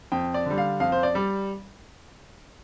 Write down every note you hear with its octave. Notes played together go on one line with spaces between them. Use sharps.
F2 G5
D5
D3 G3
F5
F2 F5
C5
D5
G3